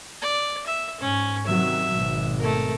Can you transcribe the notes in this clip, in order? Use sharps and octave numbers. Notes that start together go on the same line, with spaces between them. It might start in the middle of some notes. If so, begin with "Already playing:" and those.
D5
E5
G#2 C#4
C3 D#3 F#3 E5
G#1 B2
A3 A#4